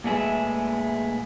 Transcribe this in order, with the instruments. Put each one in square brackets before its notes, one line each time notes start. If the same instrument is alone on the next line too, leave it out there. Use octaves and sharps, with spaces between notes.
[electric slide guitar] A#2 G#3 A3 G#4 B4 E5